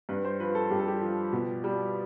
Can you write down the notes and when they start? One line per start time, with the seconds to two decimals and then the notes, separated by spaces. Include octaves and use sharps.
0.09 G2 B4
0.25 C5
0.40 F3 B4
0.55 A4
0.71 G2 G4
0.79 A4
0.88 G4
1.01 F3
1.33 B2
1.64 G3